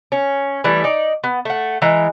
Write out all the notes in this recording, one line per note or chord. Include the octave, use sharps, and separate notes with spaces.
C#4
E3 G3 A3
D#4 D5
B3
A3 F#5
E3 G#3 A#5